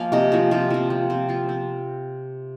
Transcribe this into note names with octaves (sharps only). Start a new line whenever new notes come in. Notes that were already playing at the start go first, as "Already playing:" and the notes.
Already playing: F3 A#3 F5 G#5
C3 D#5
F3 C4
C3 F4
F3 C4
F3
C4
F3 F4
C4